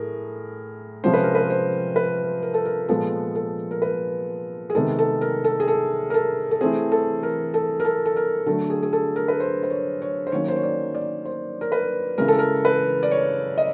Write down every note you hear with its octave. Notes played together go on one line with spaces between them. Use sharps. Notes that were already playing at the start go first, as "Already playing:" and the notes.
Already playing: A2 A3 G#4 A#4
C3 F3 G#3 C#4 C5
B4
A#4
B4
C5
B4
A#4
A4
A#4
A#2 F3 G#3 B3 A4
A4
A#4
B4
G#4
C3 D#3 G#3 B3 A4
A4
A#4
A4
G#4
A4
A#4
A4
A4
E3 A3 C4 G#4
A4
A#4
A4
A#4
A4
A4
A#4
D3 F#3 A3 A4
G#4
G#4
A4
A#4
B4
C5
C5
C#5
C#5
C5
D#3 F#3 A#3 C#4 C#5
C5
C#5
D5
D5
C5
A#4
B4
C#3 E3 G#3 A#4
A4
A#4
B4
D5
C#5
D#5